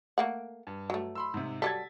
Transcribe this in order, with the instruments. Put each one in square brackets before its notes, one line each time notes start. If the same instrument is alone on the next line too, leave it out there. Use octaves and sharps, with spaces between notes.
[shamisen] A3 A#3 F#5
[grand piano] G2
[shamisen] F#3 A3
[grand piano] B5 C6 E6
G#2 C3
[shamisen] F#3 G3 A4 [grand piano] G#6 A6 B6